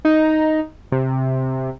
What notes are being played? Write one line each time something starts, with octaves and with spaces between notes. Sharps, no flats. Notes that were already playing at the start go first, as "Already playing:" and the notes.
D#4
C3